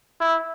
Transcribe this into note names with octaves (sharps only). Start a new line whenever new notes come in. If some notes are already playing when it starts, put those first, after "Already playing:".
E4